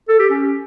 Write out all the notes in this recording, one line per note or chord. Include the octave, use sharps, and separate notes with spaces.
A4
G4
C#4